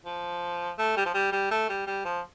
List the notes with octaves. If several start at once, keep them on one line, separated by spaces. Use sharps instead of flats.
F3
A3
G3
F3
G3
G3
A3
G3
G3
F3